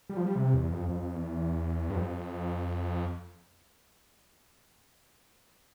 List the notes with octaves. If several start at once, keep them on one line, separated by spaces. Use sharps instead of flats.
G3
F3
G3
C3
E2
F2
F2
E2
G2
F2